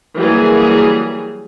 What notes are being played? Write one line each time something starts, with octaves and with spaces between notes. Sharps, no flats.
E3 F#3 G3 A#3 G#4